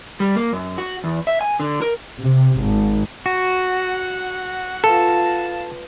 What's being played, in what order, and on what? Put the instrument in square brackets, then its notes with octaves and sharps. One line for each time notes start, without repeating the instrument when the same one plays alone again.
[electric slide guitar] G3
A#3
F#2
F#4
E2
E5
G#5
D3
A#4
[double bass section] C3
G#1
[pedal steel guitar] F#4 [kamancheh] F#5 [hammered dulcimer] A#5
[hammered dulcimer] F4 B4 [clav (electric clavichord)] A4 [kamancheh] F5 A5